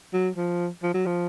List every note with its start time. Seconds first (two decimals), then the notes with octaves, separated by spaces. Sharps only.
0.13 F#3
0.36 F3
0.83 F3
0.94 F#3
1.06 F3